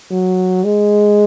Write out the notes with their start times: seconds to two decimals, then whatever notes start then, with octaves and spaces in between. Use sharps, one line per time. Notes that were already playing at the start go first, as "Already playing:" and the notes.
0.11 F#3
0.64 G#3